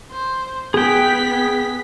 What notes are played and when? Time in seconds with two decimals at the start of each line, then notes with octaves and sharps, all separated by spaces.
0.12 C5
0.74 B3 G#4 G5 B6